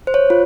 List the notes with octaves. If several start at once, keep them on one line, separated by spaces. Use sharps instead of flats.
C5
C#5
F4